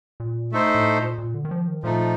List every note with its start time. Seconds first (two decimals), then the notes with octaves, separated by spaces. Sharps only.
0.20 A#2
0.52 A3 D#4 A4 C5
0.75 A2
0.96 A#2
1.18 A#2
1.34 D3
1.45 D#3
1.51 F3
1.68 D#3
1.83 A#2 F3 A3 D#4